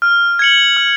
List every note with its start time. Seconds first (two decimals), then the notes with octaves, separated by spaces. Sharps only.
0.02 F6
0.39 G#6 C#7 F#7
0.77 F6